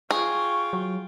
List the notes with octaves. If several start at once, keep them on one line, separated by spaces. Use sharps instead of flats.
F4 G#4 G5 C#6
F#3